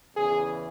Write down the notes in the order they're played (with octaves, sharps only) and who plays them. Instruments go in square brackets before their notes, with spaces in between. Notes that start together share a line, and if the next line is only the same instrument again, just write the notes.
[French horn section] E2 C#3 E3 G#4